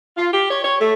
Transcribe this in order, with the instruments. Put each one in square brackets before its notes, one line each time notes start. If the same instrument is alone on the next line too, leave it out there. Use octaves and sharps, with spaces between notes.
[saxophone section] F4
G4
C#5
C#5
A3